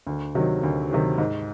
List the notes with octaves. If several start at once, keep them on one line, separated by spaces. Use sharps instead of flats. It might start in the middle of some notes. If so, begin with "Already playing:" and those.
D2
C3 D#3 F#3
D2
C3 D#3 F#3
G#2